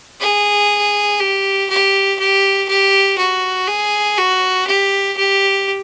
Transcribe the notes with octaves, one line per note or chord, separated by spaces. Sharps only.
G#4
G4
G4
G4
G4
F#4
G#4
F#4
G4
G4